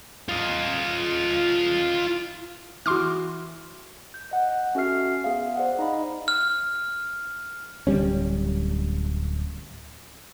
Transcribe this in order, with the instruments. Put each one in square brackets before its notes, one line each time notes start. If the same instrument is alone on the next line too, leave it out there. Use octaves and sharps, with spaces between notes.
[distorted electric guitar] F4 D#5
[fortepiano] E3 F#4 [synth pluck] C6 D6 F6
[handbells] G6
D#5 F#5
C#4 F#4 A4 E5 F6 C7
B3 G#4 E5 F5
C5 D5 F#5
D#4 D#5 F5 B5
[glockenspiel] F6
[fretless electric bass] D1 G3 C#4